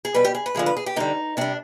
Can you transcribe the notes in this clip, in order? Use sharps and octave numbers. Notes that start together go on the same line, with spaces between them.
G#4
B2 G3 B4
G4
G#4
B4
D3 F3 G#3 G#4
B4
G#4
G4
D3 G3 D#4
C3 G3 D4